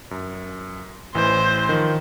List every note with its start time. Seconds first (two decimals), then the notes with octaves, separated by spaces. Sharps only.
0.11 F#2
1.15 A1 E3 C5
1.69 D#3 F3